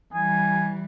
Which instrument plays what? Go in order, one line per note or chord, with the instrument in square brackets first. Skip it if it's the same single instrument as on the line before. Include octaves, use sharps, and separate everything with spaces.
[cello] E3 G3 [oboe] G#5